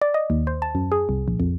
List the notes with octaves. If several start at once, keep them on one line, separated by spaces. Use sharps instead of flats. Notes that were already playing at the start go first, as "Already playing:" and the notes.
D5
D#5
D#2
C5
A5
F#2
G#4
C2
A#1
F2